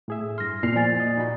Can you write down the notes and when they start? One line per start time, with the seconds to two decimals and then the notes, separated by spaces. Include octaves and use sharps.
0.08 A2 G#4 E5
0.38 G2 C6 F6 A#6
0.63 A#2 C7 F7
0.75 F3 D5 G#5 A6
1.00 D#5
1.18 D#4 F#4 B5